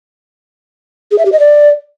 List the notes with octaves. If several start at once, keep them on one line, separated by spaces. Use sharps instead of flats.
G#4
E5
G4
D#5
D5